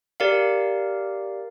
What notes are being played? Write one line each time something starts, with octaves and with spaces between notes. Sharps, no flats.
G4 A#4 D5 F5